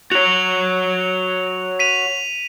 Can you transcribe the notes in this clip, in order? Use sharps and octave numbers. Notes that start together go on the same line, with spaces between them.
F#4 C#5 F7
B6 D#7 F7